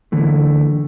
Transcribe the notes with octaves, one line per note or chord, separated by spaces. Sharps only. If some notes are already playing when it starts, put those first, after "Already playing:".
D3 E3 A3